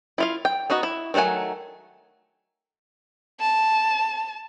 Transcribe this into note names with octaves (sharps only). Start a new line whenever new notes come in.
E4 F4 F5
G5
B3 D#4 F#4 D#5
E4
D#3 F#3 A3 F#5 G#5
A5